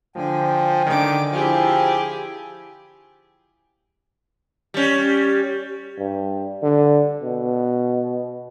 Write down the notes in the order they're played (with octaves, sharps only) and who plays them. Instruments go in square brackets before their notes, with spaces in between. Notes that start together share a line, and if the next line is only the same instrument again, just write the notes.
[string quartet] D3 [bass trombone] F3 [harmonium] G5 G#5
[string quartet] D3 D6 [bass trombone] D#3
[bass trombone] F3 [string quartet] E4 G4 G#4
[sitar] G3 C#4
[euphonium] G2
D3
B2